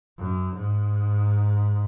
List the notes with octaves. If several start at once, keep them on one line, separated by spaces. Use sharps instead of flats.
F#2
G#2